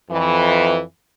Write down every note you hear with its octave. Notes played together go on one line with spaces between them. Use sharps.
F2 E3